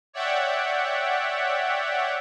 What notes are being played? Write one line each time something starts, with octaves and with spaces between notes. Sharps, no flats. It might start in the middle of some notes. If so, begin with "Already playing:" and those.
C#5 D5 E5 F#5 G5